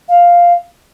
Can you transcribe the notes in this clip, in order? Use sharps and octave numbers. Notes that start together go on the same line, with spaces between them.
F5